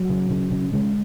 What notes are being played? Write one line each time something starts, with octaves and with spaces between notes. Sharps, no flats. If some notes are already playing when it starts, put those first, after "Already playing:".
Already playing: F#3
C#3
C#3
C#3
C#3 G#3